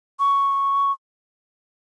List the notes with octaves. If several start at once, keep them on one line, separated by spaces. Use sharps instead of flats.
C#6